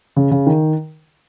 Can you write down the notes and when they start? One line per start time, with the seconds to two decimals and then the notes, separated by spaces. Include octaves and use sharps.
0.16 C#3
0.31 C#3
0.47 D#3